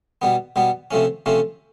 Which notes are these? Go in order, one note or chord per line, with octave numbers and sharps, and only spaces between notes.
B2 G3 B3
B2 G3 B3
C3 F3 A3 C#4
C3 F3 A3 C#4